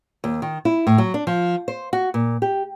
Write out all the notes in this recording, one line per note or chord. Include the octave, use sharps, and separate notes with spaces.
D#2
D#3
E4
A2
F#3
D4
F3
C5
F#4
A#2
G4